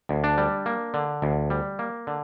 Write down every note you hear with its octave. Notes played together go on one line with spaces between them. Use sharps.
D2
D4
G3
A#3
D3
D2
G3
A#3
D3